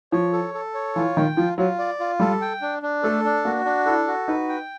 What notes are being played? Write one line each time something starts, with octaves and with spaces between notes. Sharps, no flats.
F3 C#5
A4
A4
C#5
E3 F4
D#3 G5
F3 F4
F#3 F4
D5
F4
G3 A4
G5
D4
D4
A3 A4
D4
A#3 F#4
D4
E4 A4
F#4
D#4 B4
G5